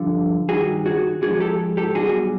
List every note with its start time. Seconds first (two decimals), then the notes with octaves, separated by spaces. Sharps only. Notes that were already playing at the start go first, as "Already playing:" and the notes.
Already playing: G2 D3 F3
0.49 G2 D#3 G3 F#4 G#4
0.86 F#4 G#4
1.22 G#2 F3 G#3 F#4 G#4
1.40 G4 A4
1.77 G4 A4
1.95 B1 B2 G3 F#4 G#4